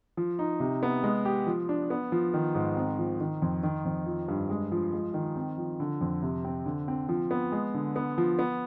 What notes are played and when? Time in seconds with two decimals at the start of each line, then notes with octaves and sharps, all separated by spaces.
0.17 F3
0.39 D#4
0.60 C3
0.83 B3
1.03 G#3
1.25 G4
1.47 F3
1.69 D4
1.90 B3
2.12 F3
2.34 D#3
2.55 G#2
2.77 C4
2.99 F3
3.20 D#3
3.42 F2
3.63 D#3
3.85 F2
4.06 F3
4.28 G2
4.50 G#3
4.72 F3
4.93 G#3
5.14 D#3
5.36 C4
5.58 F3
5.80 D3
6.01 F2
6.23 C3
6.45 C4
6.66 D3
6.88 C4
7.09 F3
7.31 B3
7.52 G#3
7.74 D3
7.96 B3
8.18 F3
8.39 B3